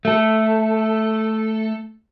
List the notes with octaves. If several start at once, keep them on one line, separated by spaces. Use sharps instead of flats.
A3 A4